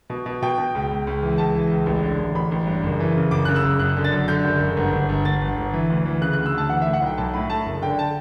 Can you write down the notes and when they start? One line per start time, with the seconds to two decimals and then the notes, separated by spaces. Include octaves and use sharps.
0.10 B2
0.26 B2
0.42 B2 G5
0.58 B2
0.75 C#2
0.91 C#2
1.07 C#2
1.23 E3
1.38 C#2 A5
1.55 E3
1.71 C#2
1.86 A1
2.03 D3
2.19 A1
2.35 A1 B5
2.51 A1
2.67 G2
2.84 F#1
3.00 E3
3.16 C#3
3.31 F#1 D6
3.45 C#3 F#6
3.56 E6
3.64 F#1
3.79 F#1 F#6
3.97 D3
4.04 A6
4.12 F#2
4.28 D3 G6
4.44 F#1
4.60 F#1
4.77 G1
4.93 G1
5.09 G1
5.25 G1 A6
5.42 G1
5.56 G1
5.73 E3
5.90 D2
6.05 E3
6.21 C#3 F#6
6.33 D2 F#6
6.46 E6
6.54 D2 A5
6.70 E3 F#5
6.82 A2 E5
6.93 F#5
7.02 B1 G5
7.17 B1 A5
7.34 A2 B5
7.50 A2 A5
7.66 F#1
7.82 D3 G5
7.99 A5